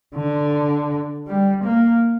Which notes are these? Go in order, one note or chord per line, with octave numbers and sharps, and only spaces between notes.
D3
G3
A#3